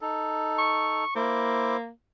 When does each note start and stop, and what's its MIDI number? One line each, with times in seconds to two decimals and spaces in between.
0.01 1.04 63
0.01 1.04 69
0.58 1.14 85
1.15 1.89 58
1.15 1.77 64
1.15 1.77 72
1.15 1.77 86